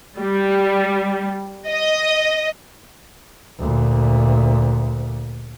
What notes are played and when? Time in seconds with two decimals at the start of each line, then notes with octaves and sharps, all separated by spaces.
0.18 G3
1.69 D#5
3.59 D2 A#2